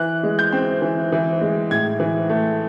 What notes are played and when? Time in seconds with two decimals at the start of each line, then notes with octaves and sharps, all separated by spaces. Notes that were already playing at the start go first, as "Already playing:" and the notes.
Already playing: E3 F#6
0.23 G#3
0.39 G6
0.52 C4
0.82 E3
1.12 E3
1.41 G#3
1.71 A2 G#6
2.00 E3
2.30 A3